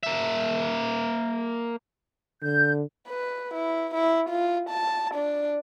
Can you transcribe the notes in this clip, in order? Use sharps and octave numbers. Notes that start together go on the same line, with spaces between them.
A#3 E5
D3 G6
B4
E4
E4
F4
A5
D4